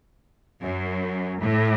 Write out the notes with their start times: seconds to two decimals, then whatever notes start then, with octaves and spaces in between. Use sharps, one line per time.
0.62 F#2
1.42 A2